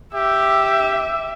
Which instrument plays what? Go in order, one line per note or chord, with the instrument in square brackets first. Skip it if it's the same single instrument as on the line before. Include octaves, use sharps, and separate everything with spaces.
[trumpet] G4 [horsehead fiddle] E5